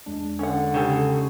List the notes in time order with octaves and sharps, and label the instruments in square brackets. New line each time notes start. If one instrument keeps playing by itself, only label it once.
[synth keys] E2 G#3 D4
[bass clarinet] D3 [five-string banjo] C#4 F#5
[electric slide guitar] C#3 [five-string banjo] D#4 G4 A4